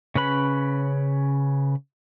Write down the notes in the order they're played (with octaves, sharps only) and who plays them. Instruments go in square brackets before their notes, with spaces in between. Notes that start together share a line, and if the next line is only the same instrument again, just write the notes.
[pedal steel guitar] C#3 C#4 B4 B5